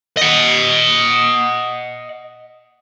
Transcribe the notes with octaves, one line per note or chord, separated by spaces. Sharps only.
D#5 F#5